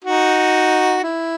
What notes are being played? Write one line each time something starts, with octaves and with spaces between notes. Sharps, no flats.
D#4 F#4
E4